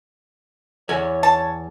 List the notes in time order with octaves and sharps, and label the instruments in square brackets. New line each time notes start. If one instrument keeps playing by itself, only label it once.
[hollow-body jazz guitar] E2 G#5 [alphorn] C#5
[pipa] A5